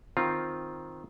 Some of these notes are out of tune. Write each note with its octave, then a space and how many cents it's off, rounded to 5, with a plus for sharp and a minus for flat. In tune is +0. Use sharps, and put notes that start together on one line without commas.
D#3 +0 C4 +0 F4 +0